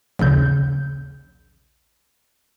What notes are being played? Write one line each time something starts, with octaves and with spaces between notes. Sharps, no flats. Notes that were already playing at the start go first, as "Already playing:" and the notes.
A#1 D#2 C#3 G6